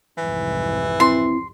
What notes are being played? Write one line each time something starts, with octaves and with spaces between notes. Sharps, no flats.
C2 F2 G#2 E3
C4 E4 C6